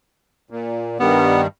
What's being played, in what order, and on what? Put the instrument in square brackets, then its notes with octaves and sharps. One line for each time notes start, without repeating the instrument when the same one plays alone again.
[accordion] A#2
[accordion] G2 D#3 G3 [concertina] B3